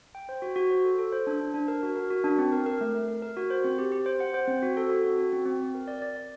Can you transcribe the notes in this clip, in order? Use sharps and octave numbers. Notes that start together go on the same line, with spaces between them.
G5
C5
F#4
F#4
C5
A4
A4
C5
D4
D4
D4
A#4
F#4
A#4
F#4
D4
C4
A#4
A#4
A3
A#4
A#4
A#4
F#4
C5
C4
G4
G4
C5
F#5
C5
C4
F#4
A4
F#4
C4
F#4
C4
C4
C4
A#4
D5
D5
D5